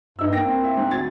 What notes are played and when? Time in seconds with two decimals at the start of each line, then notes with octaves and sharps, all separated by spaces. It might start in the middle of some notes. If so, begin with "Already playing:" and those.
0.19 G2 D#4 E6
0.31 A#3 G5 A#6
0.45 A#3 C4
0.63 E4 E5
0.77 G#2
0.91 D2 G#6 A6